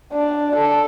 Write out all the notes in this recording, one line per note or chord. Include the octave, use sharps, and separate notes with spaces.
D4
A4